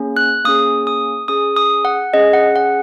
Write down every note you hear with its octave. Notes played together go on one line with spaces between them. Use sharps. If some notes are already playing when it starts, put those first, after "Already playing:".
Already playing: A#3 C#4 G#4
F#6
A#3 C#4 G#4 D#6
D#6
C#4 G#4 D#6
D#6
F#5
C#4 G#4 D#5
F#5
F#5